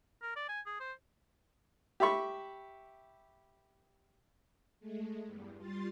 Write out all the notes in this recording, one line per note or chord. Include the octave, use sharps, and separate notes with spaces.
A#4
D5
G#5
G#4
C5
G4 E5 B5 C#6
G#3 A3
E2 G2
G3 F4 C6 A6